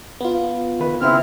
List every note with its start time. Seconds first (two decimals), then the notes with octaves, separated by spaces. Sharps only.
0.20 B3 F4
0.79 D#3 B4
1.01 C#3 C4 E4 E5 F6